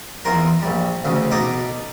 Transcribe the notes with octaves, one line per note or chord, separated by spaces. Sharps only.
E2 F4 A#4
A#1 G3
D2 C#3
B2 D#4 A4 D6 D#6